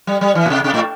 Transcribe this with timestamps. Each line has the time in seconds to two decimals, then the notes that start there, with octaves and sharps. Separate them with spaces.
0.07 G3
0.21 G3
0.35 E3
0.46 A#2
0.50 C3
0.64 C3
0.74 A2